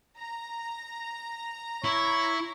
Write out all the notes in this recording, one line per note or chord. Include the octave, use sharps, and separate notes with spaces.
A#5
E4 C#5